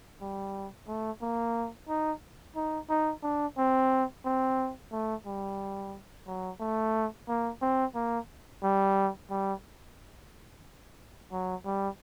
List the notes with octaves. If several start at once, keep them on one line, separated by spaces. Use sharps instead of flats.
G3
A3
A#3
D#4
D#4
D#4
D4
C4
C4
A3
G3
F#3
A3
A#3
C4
A#3
G3
G3
F#3
G3